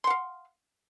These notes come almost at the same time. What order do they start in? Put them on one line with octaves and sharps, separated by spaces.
C6 F#5 F5